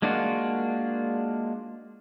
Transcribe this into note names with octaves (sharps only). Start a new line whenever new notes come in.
G#3 A#3 D4 F4 F#4